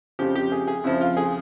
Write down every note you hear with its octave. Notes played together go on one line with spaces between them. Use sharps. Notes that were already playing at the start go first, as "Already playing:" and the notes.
F2 C#3 F3 G4
G4
G#4
G#4
F2 C#3 F3 E4
F4
G#4